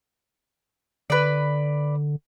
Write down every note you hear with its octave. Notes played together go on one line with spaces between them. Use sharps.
D3 B4 D5